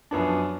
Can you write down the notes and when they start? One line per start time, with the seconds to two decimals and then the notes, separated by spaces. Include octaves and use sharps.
0.11 F#2 F3 B3 D4